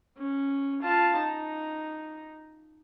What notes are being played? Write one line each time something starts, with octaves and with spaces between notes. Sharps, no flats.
C#4
F4 A5
D#4